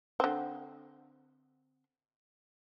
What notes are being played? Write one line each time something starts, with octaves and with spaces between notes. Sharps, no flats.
D3 C4